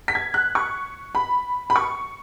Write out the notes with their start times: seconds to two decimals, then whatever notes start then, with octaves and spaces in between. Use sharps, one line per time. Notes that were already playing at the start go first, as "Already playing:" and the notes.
0.08 B6
0.15 G#6
0.34 F#6
0.55 C#6
1.15 B5
1.70 B5
1.76 C#6